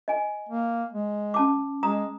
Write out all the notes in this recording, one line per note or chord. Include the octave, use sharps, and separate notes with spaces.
D#5 G#5
A#3
G#3
C#4 A5 D6
G#3 A#5 D#6